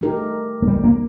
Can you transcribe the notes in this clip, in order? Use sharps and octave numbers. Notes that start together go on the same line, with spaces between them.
A3 D#4 G4 A#4
A3
G3
A#3